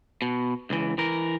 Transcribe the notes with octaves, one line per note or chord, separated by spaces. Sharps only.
B2
C#2 E3
E3 A#4